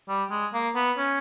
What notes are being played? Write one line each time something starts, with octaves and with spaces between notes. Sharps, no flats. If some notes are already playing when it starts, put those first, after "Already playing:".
G3
G#3
A#3
B3
C#4